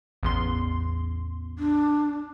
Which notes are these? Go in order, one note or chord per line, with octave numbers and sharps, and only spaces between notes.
A1 E2 C6
D4